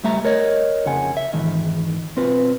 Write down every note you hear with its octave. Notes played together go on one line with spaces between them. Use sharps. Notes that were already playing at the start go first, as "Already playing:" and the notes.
C#2 G3 A3 E5 A#5
A#4 C#5 D#5
F2 C#3 F#5 G#5
E5
F2 G#2 D#3 E3
B1 C4 F4 B4